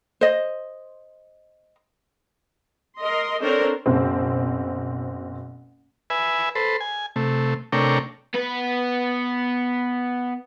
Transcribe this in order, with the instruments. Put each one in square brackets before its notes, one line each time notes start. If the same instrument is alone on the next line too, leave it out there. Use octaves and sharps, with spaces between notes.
[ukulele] C5 D#5
[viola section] A#4 D#5 C6
C4 D4 A4 A#4 C5 C#5
[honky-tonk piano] F#1 B2 C4
[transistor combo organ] B4 E5 G#5
A4 B4 C5
G#5
C3 A3
C3 A3 D4 A#4 C#5 G5
[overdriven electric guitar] B3 B4